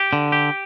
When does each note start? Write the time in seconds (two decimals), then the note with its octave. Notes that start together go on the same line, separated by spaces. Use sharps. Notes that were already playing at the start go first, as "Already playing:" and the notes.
Already playing: G4
0.13 D3
0.32 G4